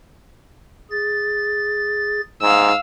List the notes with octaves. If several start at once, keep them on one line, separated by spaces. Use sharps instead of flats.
G#4 A6
G#2 F5 E6